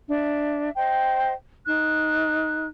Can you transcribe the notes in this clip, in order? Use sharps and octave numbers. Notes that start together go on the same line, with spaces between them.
D4 E5
C5 D#5 G5
D#4 F#6